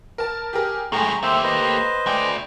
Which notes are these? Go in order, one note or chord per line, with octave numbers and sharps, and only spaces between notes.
A#4 A5
G4 G#4 A#4
F#2 A2 A3 G#4 G5 A#5 C6
A#3 G4 C5 E5
B4 C5 D#5
A3 D5 G5 G#5